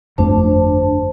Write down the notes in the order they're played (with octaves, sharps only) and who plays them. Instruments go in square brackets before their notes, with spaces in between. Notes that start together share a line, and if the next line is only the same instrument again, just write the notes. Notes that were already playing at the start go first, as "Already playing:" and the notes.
[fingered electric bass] G1 F2 A3 [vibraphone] D4 C5 A5